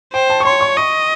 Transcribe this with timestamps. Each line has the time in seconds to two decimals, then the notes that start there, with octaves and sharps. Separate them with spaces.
0.13 C5 G5
0.30 A5
0.40 C#6
0.45 C#5 C6
0.61 C#6
0.77 D#5 C#6